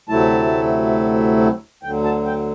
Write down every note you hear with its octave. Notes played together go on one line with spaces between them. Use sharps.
D2 C3 F#3 A3 E4 A5
D2 D3 F#3 G5
A5
G5